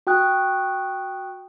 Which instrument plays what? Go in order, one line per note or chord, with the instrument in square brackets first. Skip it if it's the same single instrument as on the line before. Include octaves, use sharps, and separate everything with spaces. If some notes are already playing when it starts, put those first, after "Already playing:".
[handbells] F#4 G5 D#6 F#6